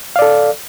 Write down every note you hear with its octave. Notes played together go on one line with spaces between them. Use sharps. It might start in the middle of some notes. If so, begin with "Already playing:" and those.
A4 D5 F5